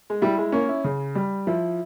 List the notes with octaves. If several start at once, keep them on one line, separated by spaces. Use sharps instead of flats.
G#3
G3 E4
G#3
A#3 C#4
E4
C#3
G3
F3 E4